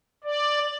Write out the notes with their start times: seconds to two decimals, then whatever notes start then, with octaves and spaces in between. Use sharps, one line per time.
0.24 D5